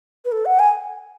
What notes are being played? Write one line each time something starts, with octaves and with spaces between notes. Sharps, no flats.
B4
A4
F#5
G#5